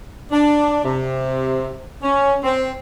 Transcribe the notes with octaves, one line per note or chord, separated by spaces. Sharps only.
D4
C3
C#4
C4